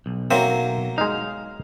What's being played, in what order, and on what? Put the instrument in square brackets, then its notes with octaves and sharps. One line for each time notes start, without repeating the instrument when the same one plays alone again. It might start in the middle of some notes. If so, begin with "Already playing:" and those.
[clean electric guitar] B1
[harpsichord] F#3 A#3 E5 [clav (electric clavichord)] C4
[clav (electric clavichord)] G#3 D#4 [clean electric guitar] F5